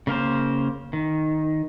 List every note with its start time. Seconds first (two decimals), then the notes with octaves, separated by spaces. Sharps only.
0.07 C#3 A#3 A#4 C5
0.93 D#3